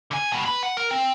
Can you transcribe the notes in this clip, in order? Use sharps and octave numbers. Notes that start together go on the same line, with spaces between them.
D3 G#5
B2 G3
B4 B5
F#5
A#4
C4